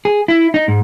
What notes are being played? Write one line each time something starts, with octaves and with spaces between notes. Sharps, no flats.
G#4
E4
D#4
G#2